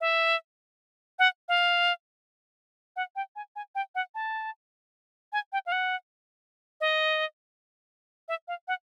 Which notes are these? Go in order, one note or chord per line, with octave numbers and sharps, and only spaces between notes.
E5
F#5
F5
F#5
G5
G#5
G#5
G5
F#5
A5
G#5
G5
F5
F#5
D#5
E5
F5
F#5